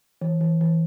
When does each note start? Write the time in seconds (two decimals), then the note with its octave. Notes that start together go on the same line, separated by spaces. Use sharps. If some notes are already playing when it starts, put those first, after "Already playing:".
0.21 E3
0.41 E3
0.61 E3